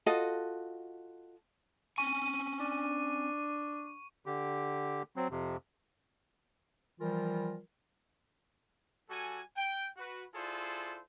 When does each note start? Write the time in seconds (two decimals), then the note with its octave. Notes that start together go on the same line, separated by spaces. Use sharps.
0.06 F4 F#4 A4 D#5
1.98 C4 C#4 G#5 C#6 D#7
2.60 D4
4.26 D3 G4
5.16 F#3 C4
5.31 F2 C3
7.00 E3 F3 G3 F4 A#4
9.10 G3 F#4 A4 G#5
9.57 G5
9.97 F#4 B4
10.35 E4 F4 G#4 A4 C5 D5